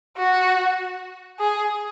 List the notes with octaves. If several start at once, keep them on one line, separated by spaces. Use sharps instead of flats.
F#4
G#4